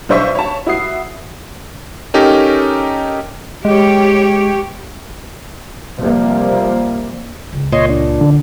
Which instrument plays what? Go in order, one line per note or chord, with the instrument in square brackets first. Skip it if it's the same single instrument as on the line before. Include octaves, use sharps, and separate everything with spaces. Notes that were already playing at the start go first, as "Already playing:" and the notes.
[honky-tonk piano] B1 D4 C5 E5 C#6 B6
C#5 A5
E4 F#4 D#6 C7
[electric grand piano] C#4 D#4 G4 A4 A#4
[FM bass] G#3 [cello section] G4 C#5
[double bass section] C3 F3 G3 A#3
[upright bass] C#2
[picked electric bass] A#2 [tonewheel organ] C#5 D#5 C6
[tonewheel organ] D4
[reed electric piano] D3